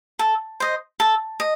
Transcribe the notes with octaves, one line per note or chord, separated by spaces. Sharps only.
A4
C5 D#5
A4
D#5